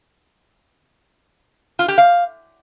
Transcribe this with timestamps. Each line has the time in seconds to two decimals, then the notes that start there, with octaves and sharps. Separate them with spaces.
1.79 F4
1.88 G4
1.98 F5